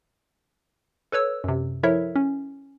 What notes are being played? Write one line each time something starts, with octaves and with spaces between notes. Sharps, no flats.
A4 B4 C#5 E6
F#2 C3
F3 E4 A4 A#4 C#5 E5
C#4